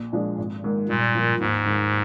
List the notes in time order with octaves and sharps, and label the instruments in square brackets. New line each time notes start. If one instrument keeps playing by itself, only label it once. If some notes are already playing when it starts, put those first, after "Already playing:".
Already playing: [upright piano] A#1
A#2 F3 G#3 D4
G#1
G#2 D#3 A#3
[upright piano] G2 [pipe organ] A#2
[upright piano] F3 A#3
[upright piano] D#2 [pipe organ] G#2
[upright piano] D#3 G#3